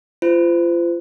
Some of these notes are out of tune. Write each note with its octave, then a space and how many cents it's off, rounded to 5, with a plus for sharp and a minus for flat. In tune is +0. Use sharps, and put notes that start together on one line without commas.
F4 -30 C5 -35